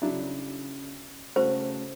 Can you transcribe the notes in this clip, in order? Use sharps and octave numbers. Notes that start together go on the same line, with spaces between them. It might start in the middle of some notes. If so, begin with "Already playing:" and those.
C#3 F#3 D4 E4
C#3 A3 F#4 C5